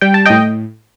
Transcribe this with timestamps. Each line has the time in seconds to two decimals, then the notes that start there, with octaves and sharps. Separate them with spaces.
0.01 G3 G5
0.14 A5
0.25 A2 D#5 G5